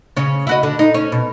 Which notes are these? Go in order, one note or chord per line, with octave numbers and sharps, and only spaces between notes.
C#3 C#4
E4 F#4 D#5
D3
D#4
C#4
B2